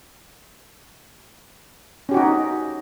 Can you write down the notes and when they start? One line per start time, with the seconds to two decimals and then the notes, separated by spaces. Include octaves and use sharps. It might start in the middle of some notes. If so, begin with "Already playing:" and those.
2.09 C#4
2.12 G4
2.14 F#4
2.17 D#4